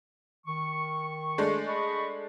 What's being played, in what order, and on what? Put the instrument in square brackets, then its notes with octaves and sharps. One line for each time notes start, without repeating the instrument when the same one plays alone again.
[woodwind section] D#3 C#6
[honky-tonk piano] G#3 A3 D4
[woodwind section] D#5 B5 C#6